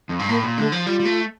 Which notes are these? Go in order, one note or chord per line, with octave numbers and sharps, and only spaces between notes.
F2
G2
A2 A#3
A#2
D3 A3
F3
G3 F4
G3
A3